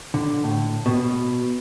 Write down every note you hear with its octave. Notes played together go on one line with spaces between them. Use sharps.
D3
A2
B2